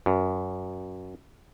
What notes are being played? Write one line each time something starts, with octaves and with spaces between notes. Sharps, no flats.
F#2